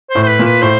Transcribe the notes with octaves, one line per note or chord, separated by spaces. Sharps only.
C5
A2
C5
B4
A#2
B4
A2 C5